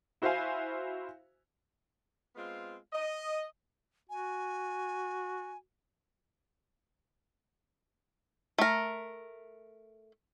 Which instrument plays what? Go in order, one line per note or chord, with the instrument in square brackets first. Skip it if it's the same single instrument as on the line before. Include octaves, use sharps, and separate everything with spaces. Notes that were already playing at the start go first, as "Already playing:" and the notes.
[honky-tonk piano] E4 F#4 C5 E5 F5 G#5
[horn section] G#3 B3 C4 F4
D#5
[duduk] F#4 [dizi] G#5
[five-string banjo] A3 A#4